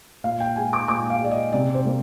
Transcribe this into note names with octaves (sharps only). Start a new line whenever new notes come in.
A#2 F5
G5
G#3 G#5
D6
A#2 D6
F5
G#3 D5
D#5
C3 D5
C5
G3 A#3